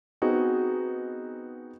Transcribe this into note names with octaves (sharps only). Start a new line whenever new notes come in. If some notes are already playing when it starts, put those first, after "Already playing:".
B3 C4 D#4 F#4 G#4